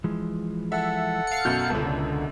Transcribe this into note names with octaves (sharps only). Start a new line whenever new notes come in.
E3 F3 G#3
A4 E5 F#5
F5 C#7
F#2 B2 F#4 G6
C#2 D3 A5